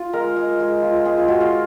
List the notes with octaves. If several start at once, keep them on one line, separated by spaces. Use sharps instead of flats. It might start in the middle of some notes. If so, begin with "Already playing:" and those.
Already playing: F4
G#3 A#4
G#3
G#3
F4
G#3 G#4
F4
G#3 F#4
F4